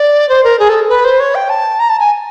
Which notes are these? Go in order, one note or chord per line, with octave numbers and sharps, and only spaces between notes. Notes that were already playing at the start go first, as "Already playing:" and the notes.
Already playing: D5
C5
A#4
G#4
A4
B4
C5
C#5
G5
A5
A#5
A5
G#5